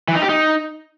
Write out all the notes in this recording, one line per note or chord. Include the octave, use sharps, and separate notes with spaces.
E3
D#4
G4
D#4